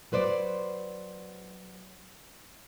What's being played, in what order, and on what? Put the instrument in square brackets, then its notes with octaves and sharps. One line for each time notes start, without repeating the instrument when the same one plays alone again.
[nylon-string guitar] F#3 B4 C5 D5